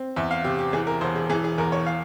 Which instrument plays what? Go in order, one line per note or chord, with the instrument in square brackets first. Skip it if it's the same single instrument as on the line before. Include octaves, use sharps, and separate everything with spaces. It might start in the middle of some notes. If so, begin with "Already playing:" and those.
Already playing: [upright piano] C4
E2 E5
F5
C3 G4
G4
E3 G#4
A#4
E1 C5
G#4
E3 G#4
G#4
E2 A#4
C#5
F5